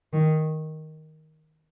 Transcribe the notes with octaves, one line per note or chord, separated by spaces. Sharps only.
D#3